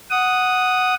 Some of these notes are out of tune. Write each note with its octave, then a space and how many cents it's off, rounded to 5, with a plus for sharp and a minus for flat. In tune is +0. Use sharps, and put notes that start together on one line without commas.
F#5 +0 D#6 +0